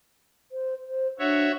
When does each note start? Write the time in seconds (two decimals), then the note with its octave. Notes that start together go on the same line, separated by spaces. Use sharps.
0.52 C5
0.88 C5
1.19 D4 F#4 C#5 E5